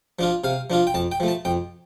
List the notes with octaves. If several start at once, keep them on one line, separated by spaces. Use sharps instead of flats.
F3 D4 F4
C3 F5
F3 D4 F4
G5
F2 A5
G5
F3 A3
A5
F2 G5